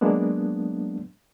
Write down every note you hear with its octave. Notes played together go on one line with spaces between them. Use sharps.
F#3 G#3 A#3 B3 D4